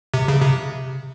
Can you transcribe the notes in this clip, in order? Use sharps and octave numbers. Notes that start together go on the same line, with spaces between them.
C3
C#3
C3